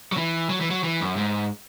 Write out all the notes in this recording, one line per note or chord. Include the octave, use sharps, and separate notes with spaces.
F#3
E3
F#3
E3
F#3
E3
F#2
G#2